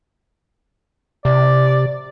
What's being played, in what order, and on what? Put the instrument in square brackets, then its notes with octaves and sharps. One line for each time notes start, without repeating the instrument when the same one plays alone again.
[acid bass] C3 [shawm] D5